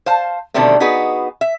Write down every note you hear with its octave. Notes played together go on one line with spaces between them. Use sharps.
C5 F5 A5
B2 D3 D#3 G3 A3 C4
B3 D#4 F#4 G#4 B4
E5